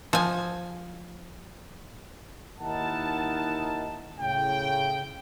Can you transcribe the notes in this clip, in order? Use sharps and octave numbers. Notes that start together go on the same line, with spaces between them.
F3 G#5
D#2 D#4 E4 A#4 F#5 A5
A2 C#3 G5